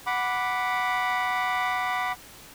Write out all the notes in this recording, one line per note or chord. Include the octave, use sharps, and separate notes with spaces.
F#5 B5 D6